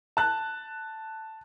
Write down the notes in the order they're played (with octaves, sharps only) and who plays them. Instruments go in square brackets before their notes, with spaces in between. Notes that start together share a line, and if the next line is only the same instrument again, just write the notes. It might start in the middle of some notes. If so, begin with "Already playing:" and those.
[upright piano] A5 F#6